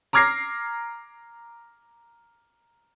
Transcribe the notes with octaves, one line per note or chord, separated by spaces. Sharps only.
A#5 D6 F6 G#6 A#6 C7